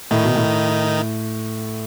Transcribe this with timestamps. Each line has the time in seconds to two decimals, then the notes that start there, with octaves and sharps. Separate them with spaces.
0.11 A2 D#3 D#4
0.24 B2
0.36 A2